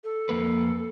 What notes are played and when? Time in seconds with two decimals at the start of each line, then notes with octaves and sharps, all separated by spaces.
0.04 A4
0.29 F2 A#3 B4